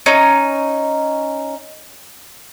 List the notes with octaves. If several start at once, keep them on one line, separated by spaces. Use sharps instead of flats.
C#4 D#4